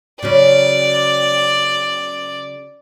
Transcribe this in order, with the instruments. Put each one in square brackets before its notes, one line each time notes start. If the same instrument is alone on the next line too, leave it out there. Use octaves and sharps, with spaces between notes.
[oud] C#3 F#3 C#4 [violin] D5